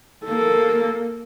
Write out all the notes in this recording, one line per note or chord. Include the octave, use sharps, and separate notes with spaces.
A#3 A4